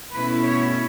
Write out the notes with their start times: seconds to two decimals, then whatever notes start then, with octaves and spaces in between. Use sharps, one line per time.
0.15 B2 A3 C#4 E4 B4
0.46 C#5